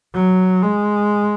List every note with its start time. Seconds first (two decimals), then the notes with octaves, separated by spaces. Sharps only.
0.14 F#3
0.62 G#3